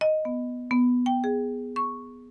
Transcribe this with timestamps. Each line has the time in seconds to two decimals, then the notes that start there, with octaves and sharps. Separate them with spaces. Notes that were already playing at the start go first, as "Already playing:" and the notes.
0.01 D#5
0.25 B3
0.71 B3
1.06 G5
1.24 G#4
1.76 C#6